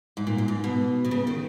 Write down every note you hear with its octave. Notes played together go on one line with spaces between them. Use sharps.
G#2
A#2
F#2
G#2
B2
B2
C#3
D#3